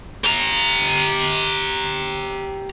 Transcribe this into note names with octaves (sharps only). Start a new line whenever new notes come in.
G4 A#5